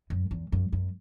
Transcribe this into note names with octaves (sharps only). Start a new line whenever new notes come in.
F#2
E2
F#2
F#2